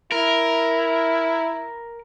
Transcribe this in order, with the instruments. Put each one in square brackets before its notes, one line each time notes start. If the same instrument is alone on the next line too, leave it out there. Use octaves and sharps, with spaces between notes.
[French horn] E4 [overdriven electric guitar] A#4